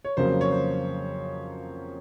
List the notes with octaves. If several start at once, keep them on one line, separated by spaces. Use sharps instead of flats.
C#5
F2 C#3 F#3 A#3 C5
C#5
C5